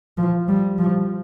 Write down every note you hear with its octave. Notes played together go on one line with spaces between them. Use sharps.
F3
G3
F3